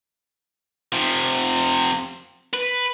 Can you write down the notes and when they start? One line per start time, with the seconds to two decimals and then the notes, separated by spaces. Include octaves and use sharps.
0.92 C3 F3
2.54 B4